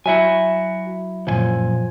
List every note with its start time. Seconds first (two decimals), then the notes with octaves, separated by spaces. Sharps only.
0.06 F#3 E4 F#4 E5 G#5
1.27 C#2 F#2 A#2 F3 G#5